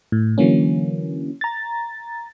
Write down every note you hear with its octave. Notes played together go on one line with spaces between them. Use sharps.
A2
D3 E3 F#3 A#3 C#4
A#5 A6